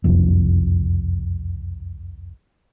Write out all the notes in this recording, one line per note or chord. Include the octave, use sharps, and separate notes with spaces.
F#1 C2 F2